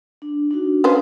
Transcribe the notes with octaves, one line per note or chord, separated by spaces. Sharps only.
D4
D4 D#4 F#4
C#4 B4 C5 F5